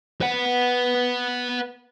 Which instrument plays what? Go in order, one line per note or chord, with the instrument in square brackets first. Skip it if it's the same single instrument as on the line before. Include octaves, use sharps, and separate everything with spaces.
[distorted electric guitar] B4 F#5